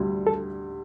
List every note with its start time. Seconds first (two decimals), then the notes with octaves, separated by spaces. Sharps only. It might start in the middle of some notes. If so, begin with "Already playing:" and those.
Already playing: D2 D3 G3
0.27 A4